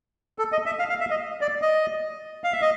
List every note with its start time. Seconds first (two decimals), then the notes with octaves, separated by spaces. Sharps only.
0.39 A4
0.52 D#5
0.66 E5
0.79 F5
0.89 F5
1.00 E5
1.10 D#5
1.41 D5
1.62 D#5
2.44 F5
2.53 E5
2.62 D#5